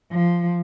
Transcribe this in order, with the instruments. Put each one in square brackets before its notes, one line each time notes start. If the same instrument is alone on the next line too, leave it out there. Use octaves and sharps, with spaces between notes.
[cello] F3